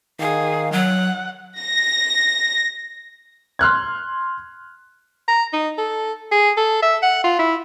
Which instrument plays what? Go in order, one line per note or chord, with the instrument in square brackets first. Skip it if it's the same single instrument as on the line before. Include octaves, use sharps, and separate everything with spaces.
[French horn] D#3 [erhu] G#4 [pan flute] F5
[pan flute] F#3 [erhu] F#5
[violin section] A#6
[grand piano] C6 F6 F#6 G#6
[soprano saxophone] A#5
D#4
A4
G#4
A4
E5
F#5
F4
E4